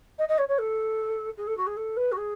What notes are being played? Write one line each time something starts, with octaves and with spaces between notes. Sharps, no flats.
D#5
D#5
C#5
C#5
A4
G#4
A4
F#4
G#4
A4
B4
F#4
G#4